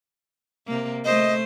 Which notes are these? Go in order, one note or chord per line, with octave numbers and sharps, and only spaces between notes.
C3 A#3
A3 C5 D#5